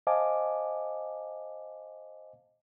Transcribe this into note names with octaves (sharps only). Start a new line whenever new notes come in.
C5 D#5 F5 G#5 A5 D6